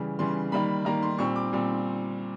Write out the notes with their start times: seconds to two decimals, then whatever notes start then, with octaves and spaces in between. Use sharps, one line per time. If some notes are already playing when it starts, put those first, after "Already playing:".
Already playing: C#3 E3 G3
0.19 C#3 E3 G3 C6
0.52 D#3 G3 A#3 B5
0.85 D#3 G3 A#3 A#5
1.03 C6
1.19 A#2 G3 C4 C#6
1.36 D6
1.53 A#2 G3 C4